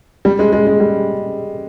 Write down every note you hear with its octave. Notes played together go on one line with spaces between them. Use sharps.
G3
G#3
G#3
G#3
G3